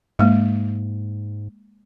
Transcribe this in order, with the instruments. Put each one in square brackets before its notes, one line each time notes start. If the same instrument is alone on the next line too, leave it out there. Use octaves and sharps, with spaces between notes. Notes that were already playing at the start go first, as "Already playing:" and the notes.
[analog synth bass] G#2 [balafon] G#3 A#3